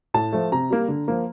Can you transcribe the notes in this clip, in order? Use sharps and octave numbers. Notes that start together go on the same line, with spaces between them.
A2 A5
F3 A3
C3 A#5
G3 A#3
D3
F3 A#3